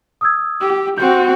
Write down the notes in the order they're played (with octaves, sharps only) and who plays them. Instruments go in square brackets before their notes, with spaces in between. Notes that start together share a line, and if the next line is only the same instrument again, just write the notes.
[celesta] D#6 E6 G#6
[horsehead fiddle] G4 [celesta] E6
[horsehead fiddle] C4 F#4 [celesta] G6